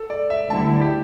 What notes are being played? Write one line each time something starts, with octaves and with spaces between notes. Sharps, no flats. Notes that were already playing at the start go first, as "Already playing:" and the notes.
Already playing: A4
D5
E5
D2 D3 G3 E4 A5
G4